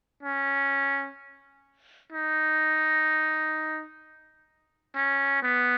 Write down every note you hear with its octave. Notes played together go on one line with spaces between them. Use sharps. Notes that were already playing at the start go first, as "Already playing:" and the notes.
C#4
D#4
C#4
B3